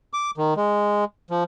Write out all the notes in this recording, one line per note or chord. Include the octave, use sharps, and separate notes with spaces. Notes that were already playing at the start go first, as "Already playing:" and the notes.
D6
D#3
G#3
F3